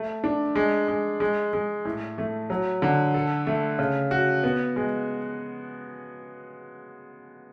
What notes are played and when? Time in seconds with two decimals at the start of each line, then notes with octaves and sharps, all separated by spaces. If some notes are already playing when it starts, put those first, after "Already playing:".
Already playing: A3
0.24 D4
0.55 G#3
0.88 G#3
1.20 G#3
1.53 G#3
1.85 A2
2.18 A3
2.50 F#3
2.82 D3
3.14 A4
3.47 A3
3.79 C#3
4.11 F#4
4.44 B3
4.76 G#3